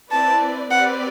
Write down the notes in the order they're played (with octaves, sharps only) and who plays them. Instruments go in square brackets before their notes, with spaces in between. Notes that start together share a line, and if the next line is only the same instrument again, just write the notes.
[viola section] C4 E4 B4 D5 [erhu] A5
[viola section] C4 G4 B4 D5 [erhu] F#5